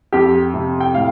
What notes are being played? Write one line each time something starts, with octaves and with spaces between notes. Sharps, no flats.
F2 G4
C3
G5
A2 F5